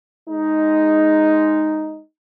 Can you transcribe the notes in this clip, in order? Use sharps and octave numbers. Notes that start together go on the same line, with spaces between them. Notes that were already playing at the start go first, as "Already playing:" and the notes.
G#3 D#4